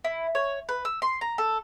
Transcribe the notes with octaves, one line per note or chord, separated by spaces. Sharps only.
E4
C#5
B4
E6
C6
A#5
A4